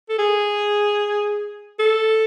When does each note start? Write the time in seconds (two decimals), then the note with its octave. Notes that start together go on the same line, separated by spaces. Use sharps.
0.09 A4
0.18 G#4
1.80 A4